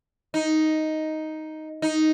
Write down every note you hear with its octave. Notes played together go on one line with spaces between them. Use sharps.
D#4
D#4